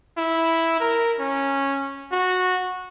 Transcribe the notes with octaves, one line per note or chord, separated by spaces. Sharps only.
E4
A#4
C#4
F#4